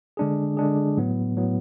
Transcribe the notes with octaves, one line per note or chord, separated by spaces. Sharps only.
D3 G#3 D4 G#4
D3 G#3 D4 G#4
A2 F#3 B3
A2 F#3 B3